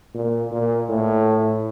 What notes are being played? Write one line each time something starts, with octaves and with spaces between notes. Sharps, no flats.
A#2
A#2
A2